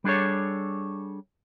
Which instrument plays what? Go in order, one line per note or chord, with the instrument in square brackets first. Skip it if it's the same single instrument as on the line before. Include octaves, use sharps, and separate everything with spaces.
[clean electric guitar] G3 D4 G#4 A4 C#5